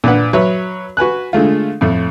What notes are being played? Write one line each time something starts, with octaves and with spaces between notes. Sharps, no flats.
A#2 D4 B4 F#5
F#3 B4 C#5 E5
F#4 B4 G#5 F#6
D3 G#3 A3 F4
F2 A2 A3